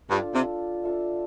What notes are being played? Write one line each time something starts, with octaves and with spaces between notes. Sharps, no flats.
G2 D4 F4 A4
C3
D4 F4 A4 E5